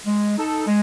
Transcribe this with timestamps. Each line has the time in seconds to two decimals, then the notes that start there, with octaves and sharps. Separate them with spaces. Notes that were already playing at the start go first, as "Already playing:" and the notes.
0.06 G#3
0.37 D#4 A4
0.67 G#3